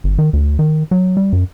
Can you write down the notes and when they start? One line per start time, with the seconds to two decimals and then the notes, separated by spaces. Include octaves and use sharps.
0.04 G1
0.18 D#3
0.33 D2
0.59 D#3
0.91 F#3
1.17 G3
1.33 F#2